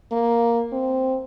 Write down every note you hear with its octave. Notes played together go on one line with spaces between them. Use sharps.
A#3
C4